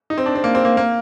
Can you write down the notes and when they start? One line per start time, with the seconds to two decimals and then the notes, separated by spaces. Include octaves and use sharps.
0.10 D#4
0.18 C4
0.26 D4
0.35 C4
0.44 A#3
0.55 C4
0.65 A#3
0.77 A#3